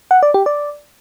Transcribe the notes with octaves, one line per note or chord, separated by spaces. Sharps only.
F#5
D5
G4
D5